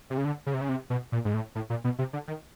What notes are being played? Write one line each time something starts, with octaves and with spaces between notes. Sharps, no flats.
C3
C#3
D3
C#3
C3
C#3
C3
B2
A#2
G#2
A2
A2
A#2
B2
C3
D3
D#3